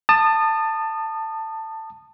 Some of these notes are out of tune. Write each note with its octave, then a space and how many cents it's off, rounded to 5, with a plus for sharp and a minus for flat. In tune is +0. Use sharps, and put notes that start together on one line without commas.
A5 +15 D#6 -25